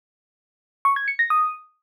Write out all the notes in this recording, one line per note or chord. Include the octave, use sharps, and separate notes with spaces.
C#6
G#6
C#7
A#6
D#6